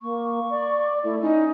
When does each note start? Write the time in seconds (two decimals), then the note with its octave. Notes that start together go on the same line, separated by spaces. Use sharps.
0.02 A#3 C#6
0.50 D5
1.04 A3 E4
1.21 C#4 D#4